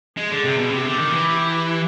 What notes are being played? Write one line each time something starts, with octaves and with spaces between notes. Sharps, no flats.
G#3 G#4
D3
C3
B2
C3 G4
D3
D#3
E3